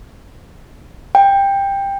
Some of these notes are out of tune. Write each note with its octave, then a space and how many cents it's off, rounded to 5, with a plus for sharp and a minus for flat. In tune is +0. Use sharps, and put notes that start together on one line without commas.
G5 +15